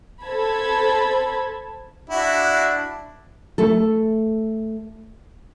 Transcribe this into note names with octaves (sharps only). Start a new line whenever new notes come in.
A4 C5 A5 B5 G#6
D4 E4 F#4
A3 A4